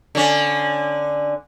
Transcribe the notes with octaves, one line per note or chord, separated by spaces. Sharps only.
D3 C#4